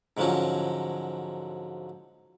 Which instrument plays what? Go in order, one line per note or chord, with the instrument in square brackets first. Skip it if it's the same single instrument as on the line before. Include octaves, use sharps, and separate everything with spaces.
[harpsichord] G#2 D3 F3 F#3 C#4